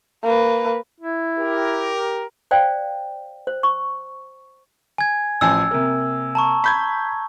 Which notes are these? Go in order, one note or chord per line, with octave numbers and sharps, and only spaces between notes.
A#3 B4
E4
G4 A#4
C5 D5 F5 G5
C5
C#6
G#5 G#6
A1 F3 G#5 E6
C3 A#3
A5 A#5 C#6
B5 G6 G#6